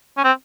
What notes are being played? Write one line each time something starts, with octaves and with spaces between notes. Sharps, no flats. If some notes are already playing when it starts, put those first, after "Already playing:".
C#4
C4